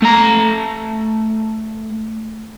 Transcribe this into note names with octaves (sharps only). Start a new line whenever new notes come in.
A3 A#5